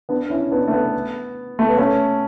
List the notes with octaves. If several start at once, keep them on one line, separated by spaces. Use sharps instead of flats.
B3 D4
C#4 E4
B3 D4
A3
B3
A3
B3
A3 C#4